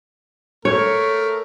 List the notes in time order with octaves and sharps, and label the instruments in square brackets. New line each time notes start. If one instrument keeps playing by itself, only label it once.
[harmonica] A3 A#4 [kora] C#5